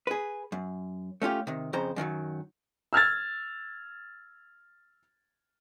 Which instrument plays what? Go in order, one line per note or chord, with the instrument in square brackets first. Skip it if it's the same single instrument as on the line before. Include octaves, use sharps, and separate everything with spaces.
[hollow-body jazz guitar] G#4 B4
F#2
A3 C#4 F4 G4
C3 D#3
F2 C#3 C5 A#5
F#2 D#3 E3 F#3
[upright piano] E6 F6 G#6 A6